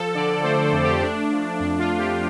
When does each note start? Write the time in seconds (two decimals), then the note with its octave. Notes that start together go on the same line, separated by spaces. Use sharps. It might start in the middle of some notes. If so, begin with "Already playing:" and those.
Already playing: F3 A4
0.15 D3 D5
0.43 A3 C5
0.63 A4
0.72 F2
0.83 G4
1.02 A3 D4
1.31 F3
1.60 F2 D4
1.79 F4
1.89 F2
1.99 G4